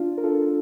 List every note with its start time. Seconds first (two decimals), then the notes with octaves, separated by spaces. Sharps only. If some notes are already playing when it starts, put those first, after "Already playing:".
Already playing: D4 F4
0.18 A#4
0.24 F4 A4